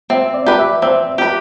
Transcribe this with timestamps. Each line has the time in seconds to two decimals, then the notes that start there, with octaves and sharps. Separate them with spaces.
0.10 C4 E5
0.34 D5
0.46 G4 B4
0.59 E5
0.82 C4 E5
1.18 G4 B4